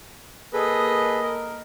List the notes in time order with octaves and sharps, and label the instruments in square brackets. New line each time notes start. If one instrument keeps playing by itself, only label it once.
[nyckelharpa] A#3 D#5 [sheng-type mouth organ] G#4 A4 B4
[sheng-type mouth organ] A#4